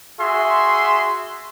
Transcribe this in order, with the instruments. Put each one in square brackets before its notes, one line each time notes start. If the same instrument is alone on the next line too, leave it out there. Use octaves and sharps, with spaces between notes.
[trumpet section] F#4 G#4 E5 C6